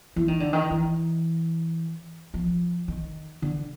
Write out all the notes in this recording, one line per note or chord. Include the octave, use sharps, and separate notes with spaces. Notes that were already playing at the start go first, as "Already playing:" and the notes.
E3
D#3
D3
D#3
E3
F3
D#3
D3